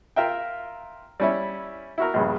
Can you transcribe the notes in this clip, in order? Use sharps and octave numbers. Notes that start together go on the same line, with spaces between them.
F4 A#4 E5 G5
G3 C#4 E4
E4 F#4 A#4
A#1 G2 C#3